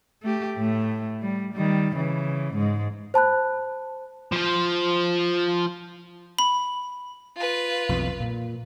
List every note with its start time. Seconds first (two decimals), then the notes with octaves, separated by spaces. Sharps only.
0.22 A3 G4
0.57 A2 A3
1.22 G3
1.53 D#3 G3
1.95 C#3 E3
2.54 G#2 G#3
3.14 C5 A5 B5 F#6
4.32 F3 C5
6.39 B5
7.36 F4 B4
7.89 B1 F2 E3
8.20 A#2